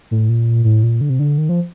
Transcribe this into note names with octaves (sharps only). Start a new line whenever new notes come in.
A2
A#2
A2
A#2
D3
C3
D3
D#3
F3